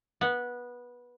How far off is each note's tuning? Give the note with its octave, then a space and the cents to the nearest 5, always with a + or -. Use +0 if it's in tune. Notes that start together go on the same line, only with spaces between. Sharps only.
B3 -15